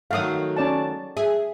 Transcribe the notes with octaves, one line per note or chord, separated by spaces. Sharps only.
D#3 F#3 A3 F5 D#6
C#4 D5 A5
G#4 E5